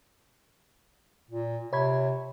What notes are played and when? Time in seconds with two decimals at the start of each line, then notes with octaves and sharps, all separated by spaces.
1.30 A#2
1.73 C3 C#5 B5 G#6